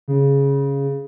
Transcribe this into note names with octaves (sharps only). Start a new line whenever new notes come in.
C#3